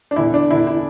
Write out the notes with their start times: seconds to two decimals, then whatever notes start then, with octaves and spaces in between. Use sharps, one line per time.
0.11 D4
0.16 E2 D3 E4
0.34 D4
0.50 E2 D3 E4
0.67 E4